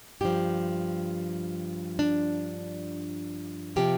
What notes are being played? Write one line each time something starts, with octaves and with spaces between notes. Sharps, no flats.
G2 F3 G4
D4
C3 F3 G4